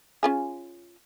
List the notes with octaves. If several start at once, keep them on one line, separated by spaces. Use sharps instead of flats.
C#4 F4 G#4